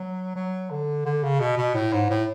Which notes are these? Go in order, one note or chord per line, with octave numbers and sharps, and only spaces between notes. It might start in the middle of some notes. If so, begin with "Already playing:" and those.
Already playing: F#3
F#3
D3
D3
C#3
B2
B2
A2
G#2
A2